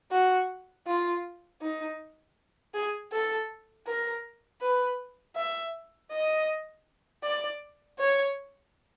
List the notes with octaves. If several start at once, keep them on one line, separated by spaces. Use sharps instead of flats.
F#4
F4
D#4
G#4
A4
A#4
B4
E5
D#5
D5
C#5